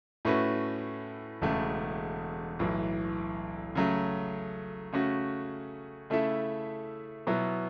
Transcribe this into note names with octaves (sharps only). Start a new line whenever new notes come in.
A2 A3 C#4 F#4 B4
E1 E2 C#3 A3
B1 A2 E3
C#3 F#3 A3
C#3 A3 C#4 F#4
C#3 A3 E4 A4 E5
B2 F#3 B3 E4